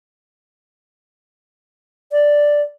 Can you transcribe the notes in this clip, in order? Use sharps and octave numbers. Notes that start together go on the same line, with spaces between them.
D5